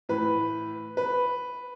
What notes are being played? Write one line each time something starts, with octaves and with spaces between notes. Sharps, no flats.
A2 E3 B4
B4